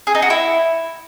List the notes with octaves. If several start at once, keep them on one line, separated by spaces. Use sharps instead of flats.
G#4
D#4
F#4
E4